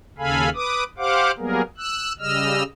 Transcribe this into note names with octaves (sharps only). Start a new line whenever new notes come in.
D#2 C#3 A4 F5 G#5 B5
B4 D6 D#6
G4 C5 F5 F#5 D6
F#3 G3 A#3 B3 G#4 A#4
E6 F#6
C#3 G3 D#5 E6 F6